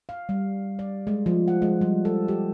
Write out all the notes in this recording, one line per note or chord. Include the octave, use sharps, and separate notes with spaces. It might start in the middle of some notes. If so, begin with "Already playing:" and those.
F5
G3
D5
G#3
F3
F#5
G#3
G3
A4
G4